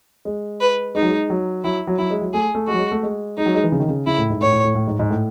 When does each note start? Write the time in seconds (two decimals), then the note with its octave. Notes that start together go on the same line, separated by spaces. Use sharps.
0.25 G#3
0.60 B4
0.95 G#3 D#4
1.02 F#3
1.09 G#3
1.30 F#3
1.64 F#3 E4
1.87 F#3
1.98 F#3 E4
2.11 G#3
2.22 F#3
2.33 A3 G#4
2.55 A3
2.68 G#3 F#4
2.73 F#3
2.79 G#3
2.91 A3
3.03 G#3
3.37 G#3 D#4
3.46 F#3
3.55 G#3
3.64 E3
3.72 C#3
3.80 D#3
3.88 C#3
4.07 C#3 E4
4.18 A2
4.30 G#2
4.41 A2 C#5
4.53 A2
4.64 A2
4.75 A2
4.87 G#2
4.99 G#2
5.10 A2